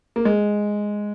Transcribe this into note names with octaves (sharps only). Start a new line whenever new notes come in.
A#3
G#3